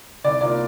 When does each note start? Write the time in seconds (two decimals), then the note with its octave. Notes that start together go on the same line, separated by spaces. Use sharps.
0.24 C2 D5
0.41 C3 A#3 F4 A#4 D5